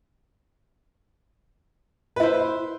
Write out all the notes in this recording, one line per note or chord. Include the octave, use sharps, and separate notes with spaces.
E4 B4 C5